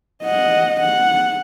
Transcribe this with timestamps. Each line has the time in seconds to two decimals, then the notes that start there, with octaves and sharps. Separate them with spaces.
0.23 D#5 F#5
0.81 F#5